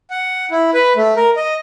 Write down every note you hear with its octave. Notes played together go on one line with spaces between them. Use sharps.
F#5
E4
B4
A3
A#4
D#5